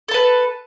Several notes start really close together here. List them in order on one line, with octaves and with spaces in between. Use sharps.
A4 A5 B4